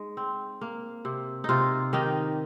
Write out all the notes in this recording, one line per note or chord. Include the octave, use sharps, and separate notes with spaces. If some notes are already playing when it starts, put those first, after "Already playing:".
Already playing: G#3 D#4
C4
A#3
C3
C3 D#4 F4
D#3 D#4 G4